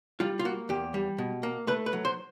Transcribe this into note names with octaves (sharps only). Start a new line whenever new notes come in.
G3 F4
F4
A#3 F#4
E2 G4
G3
B2
A#3
A3 B4
B4
F#3
C5